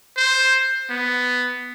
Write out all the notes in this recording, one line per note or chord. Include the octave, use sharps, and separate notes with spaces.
C5
B3